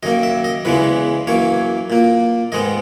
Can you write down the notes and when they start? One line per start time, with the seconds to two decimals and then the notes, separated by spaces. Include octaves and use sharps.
0.03 F#2 D#3 A#3 D#5
0.23 E5
0.44 D#5
0.65 E2 C#3 E3 G#3 B3 B4
1.27 F#2 E3 A#3 C#5
1.90 A#2 A#3
2.52 G#2 D#3 G#3 B3 D#5